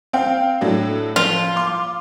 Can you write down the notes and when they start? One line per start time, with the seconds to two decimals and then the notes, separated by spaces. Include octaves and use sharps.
0.13 C4 F5 G5
0.61 A2 F#3 D4
1.16 F3 F4
1.56 C6 D6